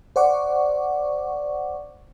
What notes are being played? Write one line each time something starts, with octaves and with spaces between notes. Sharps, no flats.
C5 D5 F#5 C#6 D6